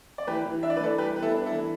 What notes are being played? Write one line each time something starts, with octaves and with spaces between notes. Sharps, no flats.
D5
E3 G4 B4
E3
D4 E5
D5
B4
E3 A4 D5
G3 G4 B4
B3 B4
E4 A4
D4
E4 A4
E3